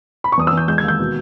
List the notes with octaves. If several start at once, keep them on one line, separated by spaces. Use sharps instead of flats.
B5
C#6
E2 D#6
E6
E2 G6
G#3 G6
G#6
D#2
G6
B2